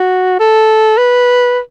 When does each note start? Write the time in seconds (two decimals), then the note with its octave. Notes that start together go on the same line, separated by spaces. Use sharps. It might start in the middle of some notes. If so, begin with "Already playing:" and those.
Already playing: F#4
0.39 A4
0.97 B4